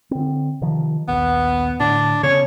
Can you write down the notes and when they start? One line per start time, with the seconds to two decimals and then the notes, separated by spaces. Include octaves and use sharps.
0.11 D3 C4
0.61 C3 D#3 F3
1.08 A#1 D#2 B3
1.80 A2 D3 D4
2.23 C#3 B3 C#4 C#5